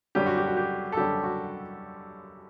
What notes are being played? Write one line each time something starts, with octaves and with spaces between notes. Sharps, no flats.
F#2 D3 G3 C#4 G4
F#4
G4
F#4
G4
A4
F#2 D3 G3 C#4 G4
F#4